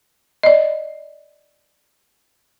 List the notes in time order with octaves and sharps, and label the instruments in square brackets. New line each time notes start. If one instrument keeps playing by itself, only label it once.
[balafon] D5 D#5